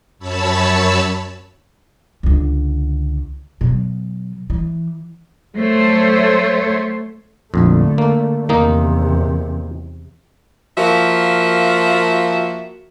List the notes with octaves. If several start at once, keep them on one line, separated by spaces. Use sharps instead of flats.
F#2 C#5 A5 B5 E6
C#2 D3
B2 F#3
E3
F#3 A3 C5 C#5
A#1 F2 D3 A3
A#3
E2 C3 D#3 A#3 D#4
F3 A#3 F#4 E5